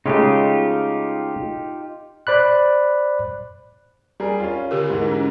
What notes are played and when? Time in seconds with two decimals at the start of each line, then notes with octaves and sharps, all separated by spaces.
0.06 C#3 G#3 A3 D#4 F4 G4
2.27 C5 D5 B5 F#6
4.20 G3 G#4 A#4
4.40 C#4 F4
4.71 D3 G4 A#4
4.90 G#2 E3
5.08 C#4